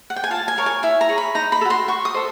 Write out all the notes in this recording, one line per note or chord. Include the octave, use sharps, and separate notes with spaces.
F#5
G5
G#5
F4 A5
G#5
A#4 C#5
G#5
E4 G#5
A#5
G#4 C#5
B5
D#4 A#5
B5
A4
F#4 C6
F#4 C#6
D#6
A4 C5 D#5